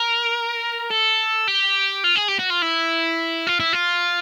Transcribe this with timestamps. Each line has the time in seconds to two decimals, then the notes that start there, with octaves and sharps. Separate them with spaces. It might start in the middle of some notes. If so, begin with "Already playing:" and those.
Already playing: A#4
0.90 A4
1.48 G4
2.04 F4
2.16 G#4
2.28 G4
2.39 F#4
2.50 F4
2.62 E4
3.47 F4
3.60 E4
3.73 F4